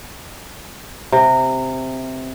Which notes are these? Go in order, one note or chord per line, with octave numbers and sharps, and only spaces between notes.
C3